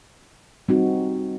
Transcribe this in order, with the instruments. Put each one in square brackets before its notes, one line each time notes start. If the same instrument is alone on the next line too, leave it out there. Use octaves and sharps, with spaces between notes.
[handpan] G3 C4 D#4 F#4